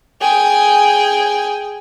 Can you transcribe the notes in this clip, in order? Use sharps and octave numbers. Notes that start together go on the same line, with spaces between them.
G#4 G5